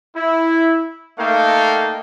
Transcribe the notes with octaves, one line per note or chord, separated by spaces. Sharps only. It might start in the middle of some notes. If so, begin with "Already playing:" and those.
E4
A3 A#3 D#4 A4 F5 G5